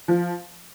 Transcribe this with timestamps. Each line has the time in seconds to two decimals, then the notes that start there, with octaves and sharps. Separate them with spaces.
0.08 F3